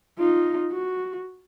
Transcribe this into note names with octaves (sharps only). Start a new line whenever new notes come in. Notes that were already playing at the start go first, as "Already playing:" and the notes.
D#4 F4
F#4